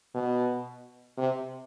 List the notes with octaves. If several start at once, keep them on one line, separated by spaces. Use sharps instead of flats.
B2
C3